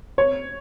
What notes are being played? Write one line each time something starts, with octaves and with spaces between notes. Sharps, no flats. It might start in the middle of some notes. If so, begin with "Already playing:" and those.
C#5